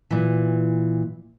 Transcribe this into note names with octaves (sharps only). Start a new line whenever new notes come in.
A#2 E3